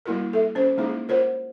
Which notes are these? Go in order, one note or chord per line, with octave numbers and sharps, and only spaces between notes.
G3 A#3 E4 F#4 A#4
A4 E5
C#4 C5
G#3 A#3 D#4 E4 G#4
F4 A#4 C5 C#5 F#5